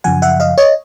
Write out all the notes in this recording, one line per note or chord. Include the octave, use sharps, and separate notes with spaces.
F#2 C#3 F3 F#5 G#5
E5 F#5
D#5 F5
C#5 D#5